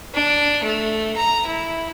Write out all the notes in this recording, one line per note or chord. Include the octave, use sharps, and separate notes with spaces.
D4
A3
A#5
E4